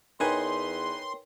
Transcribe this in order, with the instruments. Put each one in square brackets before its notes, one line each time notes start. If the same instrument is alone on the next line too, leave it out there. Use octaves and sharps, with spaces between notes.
[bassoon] E2 [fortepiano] D#4 B4 G#5 [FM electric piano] A#4 C#5 G5 [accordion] C6